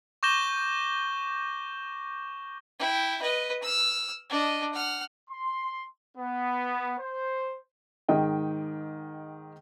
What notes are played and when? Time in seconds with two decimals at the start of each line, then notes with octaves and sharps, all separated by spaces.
0.23 C#6 D6 G6 A#6 E7 G7
2.79 E4 G5
3.21 B4 D#5
3.62 E6 F6
4.30 D4 D#5
4.73 F#5 F6
5.29 C6
6.17 B3
6.98 C5
8.09 G#2 D#3 D#5 G5